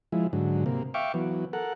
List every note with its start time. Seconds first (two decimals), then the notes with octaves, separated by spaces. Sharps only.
0.12 F3 G#3 E4
0.33 G#2 D3 F#3
0.66 C3 A#3
0.94 E5 F5 G5 C#6 D6
1.14 E3 F#3 B3
1.53 A4 A#4 F#5